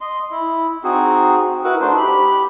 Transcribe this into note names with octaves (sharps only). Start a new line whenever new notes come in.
D#5 C6
E4
C4 D#4 F#4 G#4
E4 F#4 A#4 B4
A3 D4 D#4 C5
G4 B5